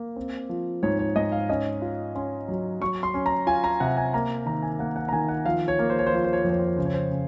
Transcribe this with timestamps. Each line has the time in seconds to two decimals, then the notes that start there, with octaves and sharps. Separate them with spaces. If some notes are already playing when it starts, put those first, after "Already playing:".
Already playing: A#3
0.16 C4
0.49 F3
0.83 G#2 C#5
0.99 C#5
1.16 G#2 D#5
1.32 F5
1.49 C#4 D#5
1.82 F4
2.15 C#4 C6
2.48 F#3
2.81 F#3 C#6
3.03 C6
3.14 C#4
3.26 A#5
3.47 F4 G#5
3.64 A#5
3.80 C3 F#5
3.97 G#5
4.14 A#3 A#5
4.46 D#3 A#5
4.62 G#5
4.79 A#3 F#5
4.96 F#5
5.09 A#5
5.12 D#3 G#5
5.29 F#5
5.46 F3 F5
5.68 C#5
5.79 A#3
5.90 C5
5.99 C#5
6.06 C5
6.12 F3 C#5
6.24 C5
6.33 C#5
6.42 F2 C5
6.50 C#5
6.59 C5
6.67 C#5
6.77 C#3 C5
6.85 C#5
6.93 C5
7.11 C#3